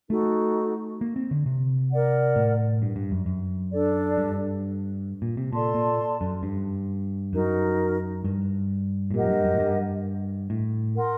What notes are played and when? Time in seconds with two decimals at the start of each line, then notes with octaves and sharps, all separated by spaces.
0.10 A3 D#4 F#4 A4
1.01 A#3
1.16 C4
1.31 D3
1.46 C3
1.91 A#4 D5 F#5
2.36 A2
2.82 G2
2.96 G2
3.12 F#2
3.26 F#2
3.72 D4 A4 D5
4.18 G2
5.22 A#2
5.37 C3
5.53 A#2 A4 D5 A5 C6
5.75 A#2
6.21 F#2
6.43 G2
7.33 F#2 D#4 F#4 A#4
8.24 G2
9.11 A2
9.14 A#2 G4 A#4 D#5 F#5
9.23 F#2
9.30 G2
9.45 F#2
9.54 A2
9.60 G2
10.50 A2
10.95 A#4 F#5 C6